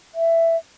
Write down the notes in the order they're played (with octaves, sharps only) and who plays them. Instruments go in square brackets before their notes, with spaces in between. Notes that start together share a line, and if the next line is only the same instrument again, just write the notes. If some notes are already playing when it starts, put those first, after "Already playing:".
[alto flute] E5